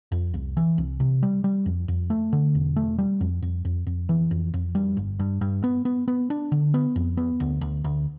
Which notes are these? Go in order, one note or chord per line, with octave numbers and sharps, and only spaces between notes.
F2
C2
E3
C2
C3
G3
G3
F2
F2
A3
D3
E1
A3
G3
F2
F2
F2
F2
E3
F2
F2
G3
G1
G2
G2
B3
B3
B3
D4
D3
B3
F2
B3
D2
D2
D2